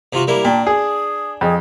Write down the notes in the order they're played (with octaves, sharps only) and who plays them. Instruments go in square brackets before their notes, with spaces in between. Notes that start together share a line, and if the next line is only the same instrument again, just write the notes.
[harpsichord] C3 F4 F#4
G3 A#3 E4
[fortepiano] A#2 [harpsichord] D4 [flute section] G5 A5
[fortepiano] G#4 [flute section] D#6
[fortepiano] F2 [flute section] G#4 D#5 G5